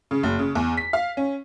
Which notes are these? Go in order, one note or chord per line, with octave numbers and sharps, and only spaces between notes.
C#3
F#1
C#3
E2
B6
F5
C#4